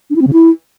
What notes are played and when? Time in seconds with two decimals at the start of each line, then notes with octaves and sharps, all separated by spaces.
0.10 D4
0.16 E4
0.21 C4
0.27 C#3
0.33 E4